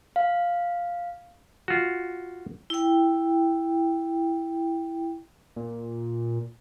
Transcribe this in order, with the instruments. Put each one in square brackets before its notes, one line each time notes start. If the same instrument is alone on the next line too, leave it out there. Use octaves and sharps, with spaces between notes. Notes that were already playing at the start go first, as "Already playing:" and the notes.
[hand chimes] F5
[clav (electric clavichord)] F4 F#4
[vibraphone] E4 G5
[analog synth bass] A#2